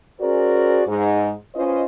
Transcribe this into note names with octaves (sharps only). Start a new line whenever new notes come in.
C#4 F#4 G#4 A#4 C5 D5
G#2
C#4 F4 B4 C5 D#5